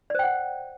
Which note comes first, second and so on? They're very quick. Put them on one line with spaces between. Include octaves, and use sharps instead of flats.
D5 C5 G5 F#5